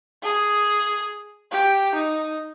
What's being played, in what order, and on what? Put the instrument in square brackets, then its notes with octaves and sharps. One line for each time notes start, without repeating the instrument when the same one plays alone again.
[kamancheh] G#4
G4
D#4